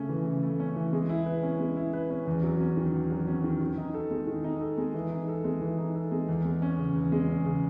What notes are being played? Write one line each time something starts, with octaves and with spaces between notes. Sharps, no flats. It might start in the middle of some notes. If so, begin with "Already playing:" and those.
Already playing: C#3 A3 C#4
E3
C#3
A3
C#4
E3
G#3
E4
B4
C#4
G#3
E4
B4
C#4
E2
F#3
C#4
D#3
E2
F#3
C#4
D#3
D#3
D#4
A4
G#3
D#3
D#4
A4
G#3
E3
D#4
A4
G#3
E3
D#4
A4
G#3
E2
G#3
C#4
C#3
E2
G#3
C#4
C#3